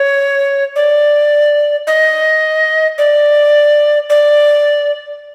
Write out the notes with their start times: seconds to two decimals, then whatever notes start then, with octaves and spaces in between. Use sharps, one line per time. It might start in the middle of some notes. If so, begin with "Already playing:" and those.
Already playing: C#5
0.76 D5
1.87 D#5
2.98 D5
4.10 D5